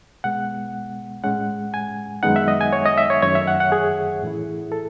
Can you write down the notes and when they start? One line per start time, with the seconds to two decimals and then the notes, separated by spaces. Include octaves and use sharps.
0.24 B2 G#3 B3 F#5
1.24 A2 G#3 C#4 F#5
1.74 G#5
2.23 F#2 D#3 G#3 B3 D#4 F#5
2.36 E5
2.48 D#5
2.61 G#5
2.73 C#5
2.86 D#5
2.98 E5
3.10 C#5
3.23 F#2 D#3 A3 C#4 C#5
3.35 E5
3.47 F#5
3.60 F#5
3.72 G#4
4.23 A2 E3 A3 E4
4.72 A4